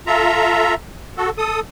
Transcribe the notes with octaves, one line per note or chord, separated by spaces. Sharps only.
F4 A4 E5 A#5
F#4 A4
A4 D#6